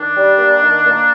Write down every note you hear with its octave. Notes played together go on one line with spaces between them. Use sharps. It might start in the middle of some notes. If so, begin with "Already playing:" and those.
Already playing: D#3 D4
G3
A#3
D#3
A#3